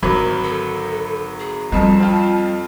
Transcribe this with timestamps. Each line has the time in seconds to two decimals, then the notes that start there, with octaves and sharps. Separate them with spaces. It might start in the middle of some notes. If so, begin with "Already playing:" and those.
0.03 G#1 D3 F#3 A#4 B5
0.44 A4
1.40 G#4
1.72 F2 F3 G3 A5
1.99 C4 F4